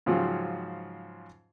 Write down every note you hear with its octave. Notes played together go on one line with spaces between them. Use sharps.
G#2 C#3 F3 F#3 F4 G4